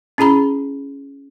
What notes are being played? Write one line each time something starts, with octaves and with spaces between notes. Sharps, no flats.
C#4 E4 G#4 A#5 B5